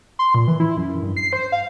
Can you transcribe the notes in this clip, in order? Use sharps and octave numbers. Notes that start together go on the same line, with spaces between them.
C6
A#2
E3
E4
F#2
G2
C7
C5
F5